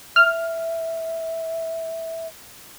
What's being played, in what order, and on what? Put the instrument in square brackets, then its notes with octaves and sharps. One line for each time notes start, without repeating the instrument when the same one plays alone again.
[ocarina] E5 [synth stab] F6